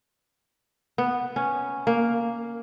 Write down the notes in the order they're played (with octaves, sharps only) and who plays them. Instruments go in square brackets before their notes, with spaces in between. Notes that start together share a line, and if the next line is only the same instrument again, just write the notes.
[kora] B3
C#4
A#3